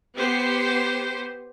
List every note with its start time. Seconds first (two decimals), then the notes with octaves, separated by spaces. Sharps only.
0.15 B3 G4 C5